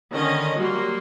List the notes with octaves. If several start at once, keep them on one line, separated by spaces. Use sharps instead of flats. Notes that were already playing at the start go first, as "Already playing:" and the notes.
D3 D#3 C#4 D#5
F#3 G3 A#3 F#4 C6